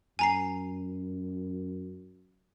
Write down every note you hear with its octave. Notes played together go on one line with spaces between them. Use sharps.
F#2 G#5 A#5 C7